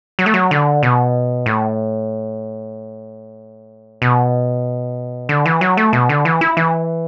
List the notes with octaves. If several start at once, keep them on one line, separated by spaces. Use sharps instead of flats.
F#3
A3
F#3
D3
B2
A2
B2
D3
E3
F#3
A3
B2
D3
E3
E4
E3